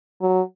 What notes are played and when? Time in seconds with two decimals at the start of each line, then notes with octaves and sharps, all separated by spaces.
0.21 F#3